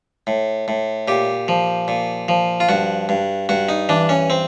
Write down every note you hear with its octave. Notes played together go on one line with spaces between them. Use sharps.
A2
A2
A#2 G4
F3
A#2
F3
F4
G2 F#4
G2
G2 F#4
D#4
E3 D4
C#4
C4